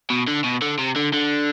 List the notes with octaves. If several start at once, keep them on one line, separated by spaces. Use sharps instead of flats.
B2
D3
B2
D3
C3
D3
D3